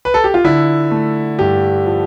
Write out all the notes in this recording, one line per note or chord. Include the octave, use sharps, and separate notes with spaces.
B4
A4
G4
F4
D3 E4
A3
G2 G4
F3